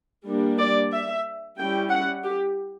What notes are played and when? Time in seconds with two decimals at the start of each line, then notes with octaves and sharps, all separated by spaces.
0.25 G3 A#3 D4
0.58 D5
0.92 E5
1.57 G3 C#4 E4 G5
1.90 F#5
2.23 G4